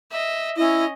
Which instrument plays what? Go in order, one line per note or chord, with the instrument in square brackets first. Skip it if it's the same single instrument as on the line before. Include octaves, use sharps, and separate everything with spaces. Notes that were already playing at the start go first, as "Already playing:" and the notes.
[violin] D#5 E5
[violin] C#4 D#5 [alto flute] E4